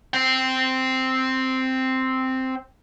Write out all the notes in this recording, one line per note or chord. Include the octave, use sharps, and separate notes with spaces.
C4 G5